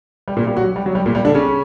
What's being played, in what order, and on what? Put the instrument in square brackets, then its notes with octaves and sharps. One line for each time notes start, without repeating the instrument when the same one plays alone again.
[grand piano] G3
A#2 A#3
G3 G4
F#3 F#4
G3
F#3
G3
A#2 A#3
G3
D3 D4
C#3 C#4